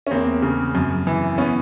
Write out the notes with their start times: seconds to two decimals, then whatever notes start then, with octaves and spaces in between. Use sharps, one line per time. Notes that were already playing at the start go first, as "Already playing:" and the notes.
0.07 C#4
0.11 E2 A#3 C4
0.42 C#3
0.75 F#2
1.07 E3
1.38 B3 C#4